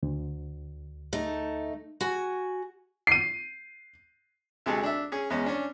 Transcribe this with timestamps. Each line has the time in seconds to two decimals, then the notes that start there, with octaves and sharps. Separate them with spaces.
0.03 D2
1.13 A3 D#4
2.01 F#4 G#5
3.07 C7 D#7
4.66 D2 C3 G#3 G#4 A4
4.83 D4 E5
5.12 C#4 G#4
5.30 E2 G#3 C#4
5.46 C#4 D4